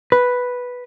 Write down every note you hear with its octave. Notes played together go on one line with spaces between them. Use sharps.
B4